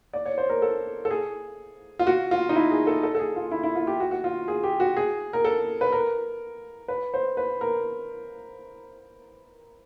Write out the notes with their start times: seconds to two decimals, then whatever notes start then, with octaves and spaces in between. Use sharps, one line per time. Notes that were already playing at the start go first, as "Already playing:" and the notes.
0.13 D5
0.26 C#5
0.38 C5
0.49 A#4
0.62 A4
1.05 A4
1.10 G#4
1.99 F4
2.07 F#4
2.31 F4
2.49 D#4
2.55 E4
2.71 G#4
2.87 A4
3.03 A4
3.15 A4
3.19 G#4
3.36 F4
3.51 E4
3.63 E4
3.75 F4
3.87 G4
4.00 F#4
4.11 F#4
4.24 F4
4.48 G#4
4.63 G4
4.80 F#4
4.97 G#4
5.33 A#4
5.45 A4
5.81 B4
5.92 A#4
6.88 B4
7.14 C5
7.37 B4
7.61 A#4